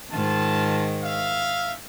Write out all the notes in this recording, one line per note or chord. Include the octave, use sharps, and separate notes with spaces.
G#2 D#3 F4 A5
E5 F5